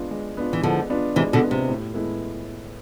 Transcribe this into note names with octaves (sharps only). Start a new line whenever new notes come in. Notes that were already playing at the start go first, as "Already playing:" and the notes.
Already playing: G#3 B3 D4 F4
G#3
B3 D4 F4
E3
D3 F3 G#3
B3 D4 F4
C3 E3 G#3
B2 D3
B3 D4 F4
C3
A2
G#3 B3 E4 A4